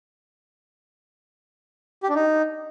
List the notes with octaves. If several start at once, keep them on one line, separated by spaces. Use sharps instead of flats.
G4
D4
D#4